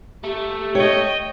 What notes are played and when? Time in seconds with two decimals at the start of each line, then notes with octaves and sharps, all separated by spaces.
0.24 A3 G4
0.75 C#5 D#5 G5